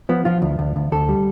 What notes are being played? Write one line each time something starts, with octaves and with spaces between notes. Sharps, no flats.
F3 B3
F3 F4
D2
D2
D2
D2 A4
G3